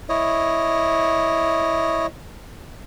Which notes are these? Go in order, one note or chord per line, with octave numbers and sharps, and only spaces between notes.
E4 C#5 D#5